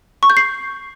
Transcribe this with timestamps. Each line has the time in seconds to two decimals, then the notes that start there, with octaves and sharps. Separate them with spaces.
0.23 C#6
0.30 G6
0.37 C7